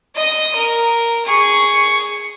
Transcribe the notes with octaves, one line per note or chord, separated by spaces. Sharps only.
D#5 D#6
A#4
G#4 C#6